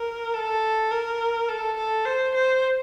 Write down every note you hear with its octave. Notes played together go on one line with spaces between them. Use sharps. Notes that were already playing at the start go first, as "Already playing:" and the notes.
Already playing: A#4
A4
A#4
A4
A4
C5
C5